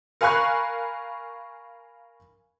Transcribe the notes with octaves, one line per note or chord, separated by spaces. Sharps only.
A#4 F5 G#5 B5 C#6 F#6